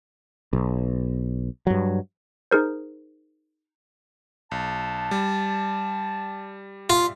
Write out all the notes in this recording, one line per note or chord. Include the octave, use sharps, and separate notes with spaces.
B1
G2 F#3
D#4 G#4 A#4 C5
B1 A5
G3
F4 D5 E5 F5